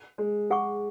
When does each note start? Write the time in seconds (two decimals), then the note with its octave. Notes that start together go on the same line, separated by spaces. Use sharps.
0.18 G#3
0.51 G#4 F#5 C#6